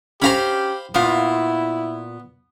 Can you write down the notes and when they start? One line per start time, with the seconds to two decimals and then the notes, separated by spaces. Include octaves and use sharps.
0.22 C#4 D4 G4 C5 F5 A#5 B5
0.94 A#2 B3 E4 F4